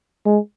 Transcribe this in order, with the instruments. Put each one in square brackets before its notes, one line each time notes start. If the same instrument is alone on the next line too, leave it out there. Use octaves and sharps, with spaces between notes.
[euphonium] G#3